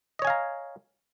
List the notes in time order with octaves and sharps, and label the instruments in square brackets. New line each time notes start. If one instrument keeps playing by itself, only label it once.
[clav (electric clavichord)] D#5
C#5
G#5
F5
A#5